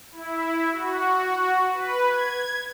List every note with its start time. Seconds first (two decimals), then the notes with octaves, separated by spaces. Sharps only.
0.12 E4
0.71 F#4
1.71 B4
2.05 G#6